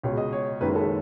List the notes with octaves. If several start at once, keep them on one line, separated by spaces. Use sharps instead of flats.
C#2 B2 G#3 C#5
D#5
C#5
F#1 F#2 D#3 G#3 B4
A4